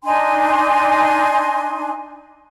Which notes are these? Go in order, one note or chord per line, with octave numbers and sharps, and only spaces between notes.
D4 D#4 G#5 C6